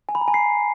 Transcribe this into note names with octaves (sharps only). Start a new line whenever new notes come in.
G#5
B5
A#5
G#5
C7